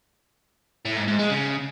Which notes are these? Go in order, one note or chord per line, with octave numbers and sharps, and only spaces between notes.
A2
G#2
G#2
G#3
C#3